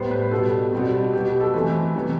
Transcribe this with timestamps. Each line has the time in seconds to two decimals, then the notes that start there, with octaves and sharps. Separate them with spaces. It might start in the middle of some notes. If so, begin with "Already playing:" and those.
Already playing: A2 G3 B3 C5
0.11 B4
0.31 B2 G3 B3 A4
0.73 B2 G3 C4
1.13 B2 F#3 B3 G4
1.27 G4
1.40 A4
1.54 E3 A3 C4 B4
1.95 C3 E3 B3